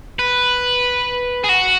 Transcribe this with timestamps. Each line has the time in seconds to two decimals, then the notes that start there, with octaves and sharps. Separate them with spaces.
0.19 B4
1.44 G#4
1.49 F#4